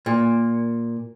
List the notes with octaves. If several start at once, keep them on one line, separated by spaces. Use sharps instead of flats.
A#2